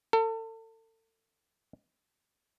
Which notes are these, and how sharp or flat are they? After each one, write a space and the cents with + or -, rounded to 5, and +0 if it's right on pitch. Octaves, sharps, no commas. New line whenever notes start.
A4 +35